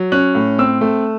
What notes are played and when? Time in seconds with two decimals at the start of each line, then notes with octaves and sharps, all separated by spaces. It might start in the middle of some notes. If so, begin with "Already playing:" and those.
Already playing: F#3
0.12 C#4 F#6
0.35 A2
0.59 C4 E6
0.81 A3